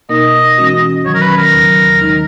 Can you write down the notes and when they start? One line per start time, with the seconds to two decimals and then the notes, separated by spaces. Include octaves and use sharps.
0.09 B2 A#3 D#4 A#4 D#5
0.58 E3 G#3 C#4 F#4
1.05 D#3 F#3 C#4 C#5
1.14 A#4
1.22 B4
1.38 A#4
1.53 D#2 C#3 F#3
2.01 D#3 G#3 D#4